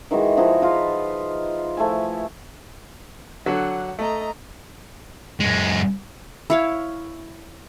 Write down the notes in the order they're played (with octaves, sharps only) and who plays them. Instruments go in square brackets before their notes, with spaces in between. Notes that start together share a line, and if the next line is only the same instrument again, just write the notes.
[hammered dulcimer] D#3 E3 G#3 F#4
F3 D#4 E4 F#4
F4 B4
F3 A3 E4 G#5
[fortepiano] D3 F#3 [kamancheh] F#5
[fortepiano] A3 [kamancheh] D#5 A#5
[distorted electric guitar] F#2 G#3
[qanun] E4 C#5 F5